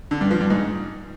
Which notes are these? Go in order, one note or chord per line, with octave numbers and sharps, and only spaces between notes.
D3
G2
F3
G2
G#2